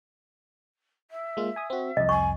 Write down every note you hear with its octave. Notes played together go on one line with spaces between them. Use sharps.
E5
G#3 A#3 F4
G#5 D#6
C4 F#4
C2 F2 D#5
G#5 C#6